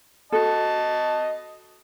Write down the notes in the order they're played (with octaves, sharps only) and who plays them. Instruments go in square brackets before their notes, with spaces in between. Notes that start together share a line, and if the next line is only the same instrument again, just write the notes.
[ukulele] F#4 A4 [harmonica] D#5 A5